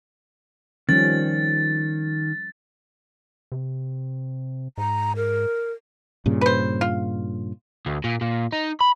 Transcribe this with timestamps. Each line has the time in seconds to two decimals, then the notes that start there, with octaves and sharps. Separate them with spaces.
0.89 D#3 F3 G3 C#4 A6
3.52 C3
4.78 G#2 A#5
5.16 A#4
6.26 G2 A#2 C#3
6.41 B4 C5
6.81 F4
7.86 D2
8.04 A#2
8.21 A#2
8.53 D#4
8.81 B5